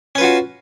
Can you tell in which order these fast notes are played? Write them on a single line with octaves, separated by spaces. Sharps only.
C#4 B4 F4 F#4